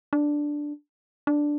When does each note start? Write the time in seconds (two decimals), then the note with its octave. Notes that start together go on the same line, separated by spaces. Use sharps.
0.13 D4
1.27 D4